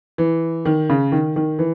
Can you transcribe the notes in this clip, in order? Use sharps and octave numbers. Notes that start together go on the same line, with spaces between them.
E3
D#3
C#3
D#3
D#3
E3